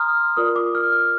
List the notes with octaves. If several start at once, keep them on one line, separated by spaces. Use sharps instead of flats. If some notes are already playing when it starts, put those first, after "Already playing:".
Already playing: A#5 C6 D#6 F6
F4 A#4 D5 D#6
D6
F6
F6